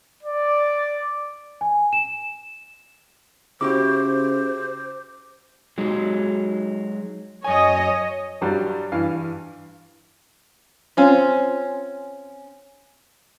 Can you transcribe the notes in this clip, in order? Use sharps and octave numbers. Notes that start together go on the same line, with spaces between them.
D5
G#5
E7
C#3 E4 F#4 G4 C5 D6
F#3 G#3 D#4
F#2 C#5 D#5 G#5
G2 F#3 G3
G2 E3 F5
C4 C#4 F4